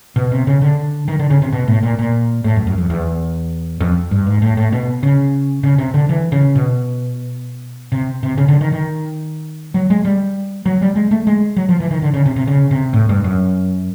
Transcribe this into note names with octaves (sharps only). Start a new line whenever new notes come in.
B2
C3
C#3
D3
D#3
D3
C#3
C3
B2
A2
A#2
A#2
A2
F#2
F#2
F2
E2
F2
G2
G#2
A2
A2
B2
C#3
C#3
C3
D3
E3
C#3
B2
C3
C3
C#3
D3
D#3
D#3
F#3
G#3
G3
F#3
G3
G#3
A3
G#3
F#3
F3
E3
D#3
D3
C#3
C3
C3
C#3
C3
A2
G2
F#2